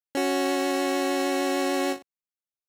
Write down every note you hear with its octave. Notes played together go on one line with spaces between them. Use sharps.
C#4 F#4